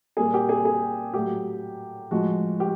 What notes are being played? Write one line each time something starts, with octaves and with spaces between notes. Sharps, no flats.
A#2 G3 A#3 G#4
G4
G#4
G#4
A2 F#3 A3 G4
A2 F3 G#3 F#4
G4